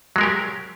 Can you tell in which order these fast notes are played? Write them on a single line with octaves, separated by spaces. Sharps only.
F#3 G#3 A#4 G4